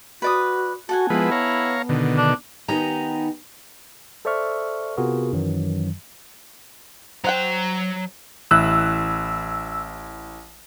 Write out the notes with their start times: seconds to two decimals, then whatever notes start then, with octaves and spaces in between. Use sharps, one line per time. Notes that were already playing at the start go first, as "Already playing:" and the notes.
0.22 F#4 B4 D5 D#6
0.89 F#4 A4 F#5 G#5
1.10 F3 G#3 B3 E4 B4
1.31 C#5 F5 A#5
1.89 B2 D3 D#3
2.17 D4
2.68 D#3 B3 D#4 G4 G#5 A#5
4.25 A4 C5 D5 E5 C#6 F6
4.97 C3 B3 F4 F#4 G#4 A#4
5.33 F#2 D#3 E3 F#3
7.24 F#3 C5 F#5 G5 A#5
8.51 A1 E4 E6 F#6